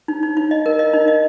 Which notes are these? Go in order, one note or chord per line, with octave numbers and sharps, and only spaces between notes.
D#4
D#4
D#4
D#5
A#4
D#5
D#4
D#5